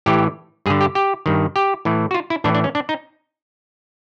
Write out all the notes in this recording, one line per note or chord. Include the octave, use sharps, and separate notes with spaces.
A2 E3 G4
G2 D3 G#4
G4
G4
G2 D#3
G4
A2 E3
F#4
F4
E4
A2 E3 D4
D4
C#4
D4
D#4